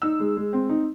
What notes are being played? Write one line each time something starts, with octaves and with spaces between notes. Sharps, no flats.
D#4 E6
G#3
G#3
C4
D#4